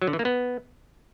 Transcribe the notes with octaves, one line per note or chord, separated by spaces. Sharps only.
F#3
D3
E3
A#3
B3